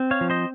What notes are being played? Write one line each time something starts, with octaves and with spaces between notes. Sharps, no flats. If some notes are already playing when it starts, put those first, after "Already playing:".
Already playing: C4
C#5 F5
F3
C5 D#5